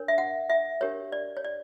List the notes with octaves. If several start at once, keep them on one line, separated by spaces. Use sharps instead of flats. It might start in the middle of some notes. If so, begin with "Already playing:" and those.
Already playing: D4 A#4 C#5
E5
F#5
E5
D4 G4 A#4 C#5
D5
C#5
D5